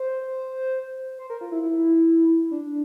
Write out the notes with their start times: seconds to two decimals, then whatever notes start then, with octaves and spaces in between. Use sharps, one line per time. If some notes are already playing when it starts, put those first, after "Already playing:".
Already playing: C5
1.19 C5
1.30 A#4
1.41 F4
1.52 E4
1.63 E4
2.51 D4